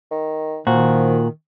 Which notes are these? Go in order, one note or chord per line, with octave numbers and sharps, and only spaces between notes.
D#3
A#2 D#3 F3 F#4